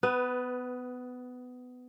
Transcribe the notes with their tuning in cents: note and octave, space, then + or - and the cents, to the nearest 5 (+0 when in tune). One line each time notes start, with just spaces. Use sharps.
B3 +20 B4 +0